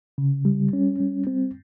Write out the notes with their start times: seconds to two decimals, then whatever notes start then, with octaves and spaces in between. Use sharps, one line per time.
0.18 C#3
0.45 G3
0.73 C#4
1.00 G3
1.27 C4